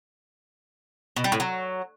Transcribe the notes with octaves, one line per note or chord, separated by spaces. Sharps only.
B2
G3
A2
F#3